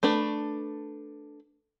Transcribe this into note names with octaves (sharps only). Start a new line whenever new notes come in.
A3 D4 B4